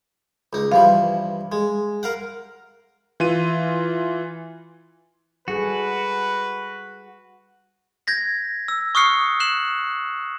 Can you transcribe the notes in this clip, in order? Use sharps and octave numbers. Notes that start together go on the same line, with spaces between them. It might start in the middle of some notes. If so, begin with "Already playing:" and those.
C#2 D#4
G2 E3 F3 F5
G#3
A#4 F5 F#5
E3 F4 D#7
G3 F#4 G#4 A4 B4
G6 G#6 A#6 B6
E6
C#6 D#6 F6 F#6 C7 C#7
F#6 C7 E7 F#7